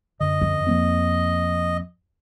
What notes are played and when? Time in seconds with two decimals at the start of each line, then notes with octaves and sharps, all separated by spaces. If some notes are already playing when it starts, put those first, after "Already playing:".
0.20 F#2 D3 D#5
0.41 F2
0.67 F3 A#3 C4